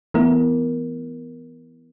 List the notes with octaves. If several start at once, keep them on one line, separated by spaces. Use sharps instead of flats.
E3 A3 B3 E4 A#4